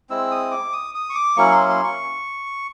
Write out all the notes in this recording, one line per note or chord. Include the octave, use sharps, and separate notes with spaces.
G#3 C4 E4 E6
D#6
D6
D#6
D#6
C#6
D6
F#3 A#3 C#4 E4 C#6
C6
C6
C#6